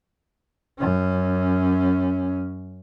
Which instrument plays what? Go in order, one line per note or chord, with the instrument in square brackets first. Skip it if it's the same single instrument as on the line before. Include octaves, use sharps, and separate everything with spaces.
[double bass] F#2 C#4